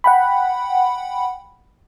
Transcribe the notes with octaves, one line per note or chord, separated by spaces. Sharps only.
F#5 G5 B5